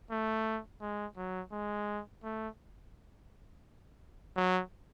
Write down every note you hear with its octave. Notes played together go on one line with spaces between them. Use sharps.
A3
G#3
F#3
G#3
A3
F#3